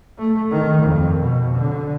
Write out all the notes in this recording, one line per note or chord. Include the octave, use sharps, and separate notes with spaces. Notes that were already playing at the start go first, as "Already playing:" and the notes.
A3
D#3
F2
B2
D3